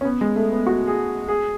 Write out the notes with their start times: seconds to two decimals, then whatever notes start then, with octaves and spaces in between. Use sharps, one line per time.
0.01 C#4
0.05 B3
0.21 G#3
0.36 A3
0.52 B3
0.67 F#4
0.87 G#4
1.28 G#4